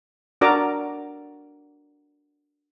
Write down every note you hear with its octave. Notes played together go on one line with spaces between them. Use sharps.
D4 F#4 A#4 D5 A#5 D6